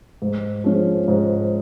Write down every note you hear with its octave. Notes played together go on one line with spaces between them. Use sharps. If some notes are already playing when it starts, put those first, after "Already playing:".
G#2
F3 G#3 C#4
G#2